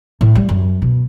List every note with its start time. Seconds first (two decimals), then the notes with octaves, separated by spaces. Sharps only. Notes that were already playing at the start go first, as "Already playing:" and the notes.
0.21 A2
0.35 G3
0.49 F#2
0.82 B2